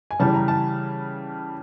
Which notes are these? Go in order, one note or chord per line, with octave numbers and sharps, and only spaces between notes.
G#5
C#3 E3 G3 A5
A#5
A5